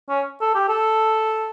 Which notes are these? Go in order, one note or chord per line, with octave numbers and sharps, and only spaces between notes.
C#4
A4
G4
A4